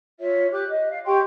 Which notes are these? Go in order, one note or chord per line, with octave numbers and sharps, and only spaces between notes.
F4 C#5 E5
G4 D6 F#6
D#5
F5
G4 G5 C6 C#6